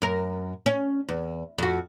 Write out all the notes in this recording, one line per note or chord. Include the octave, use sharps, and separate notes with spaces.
F#2 A#4
C#4
E2
F2 F#4